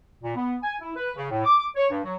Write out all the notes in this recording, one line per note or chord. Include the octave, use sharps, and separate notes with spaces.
A#2
B3
G#5
E4
B4
C#3
A2
D6
C#5
G2
F#3